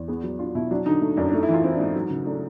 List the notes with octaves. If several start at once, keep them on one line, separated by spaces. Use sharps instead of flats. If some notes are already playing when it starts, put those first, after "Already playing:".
Already playing: E2
B3 G#4
F#3
D4 F4
B2 E4
F#3 D4
D3 D#4
A3
F#2 D4
D4
A3 D#4
E4
E3
F4
C4 E4
D4
G#2 D#4
F#3
C#3
A3 D4